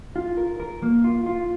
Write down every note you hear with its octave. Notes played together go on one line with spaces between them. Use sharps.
F4
A#4
A#4
A#3
F4
F4